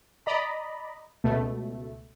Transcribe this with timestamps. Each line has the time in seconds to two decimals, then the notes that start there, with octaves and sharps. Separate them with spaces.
0.26 D5 D#5 A#5 B5
1.24 C#2 B2 A3